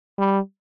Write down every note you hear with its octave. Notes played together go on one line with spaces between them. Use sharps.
G3